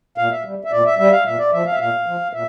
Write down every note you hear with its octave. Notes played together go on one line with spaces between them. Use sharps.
A#2 F5
E5
G3
E5
A#2 D5
E5
G3 E5
F5
A#2 E5
D5
F3 E5
F5
E5
A#2 F5
F3
A#2 E5